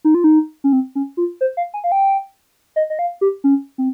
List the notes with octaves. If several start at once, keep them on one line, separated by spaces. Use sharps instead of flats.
D#4
F4
D#4
C#4
C4
C#4
F4
C5
F5
G#5
F5
G5
D#5
D#5
F5
G4
C#4
C4